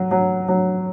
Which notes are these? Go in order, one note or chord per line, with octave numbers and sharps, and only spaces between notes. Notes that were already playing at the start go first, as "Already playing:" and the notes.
Already playing: F#3
F#3
F#3